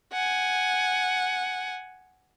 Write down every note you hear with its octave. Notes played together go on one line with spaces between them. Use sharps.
F#5 G#5